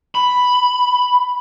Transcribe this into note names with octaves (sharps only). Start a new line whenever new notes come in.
B5